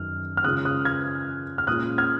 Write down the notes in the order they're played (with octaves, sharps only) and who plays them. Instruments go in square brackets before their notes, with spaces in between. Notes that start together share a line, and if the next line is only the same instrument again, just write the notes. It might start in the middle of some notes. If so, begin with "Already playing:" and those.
Already playing: [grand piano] F#2 D#3 D#4 F6
F6
C#3 G#3 C#4 F4 D#6 F#6
D#6 F#6
F6 G#6
F6
A#2 G#3 C#4 F4 D#6 F#6
F6 G#6